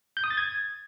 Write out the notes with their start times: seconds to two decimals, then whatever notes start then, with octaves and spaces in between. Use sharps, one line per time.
0.17 G6
0.24 D#6
0.31 A6
0.37 G#6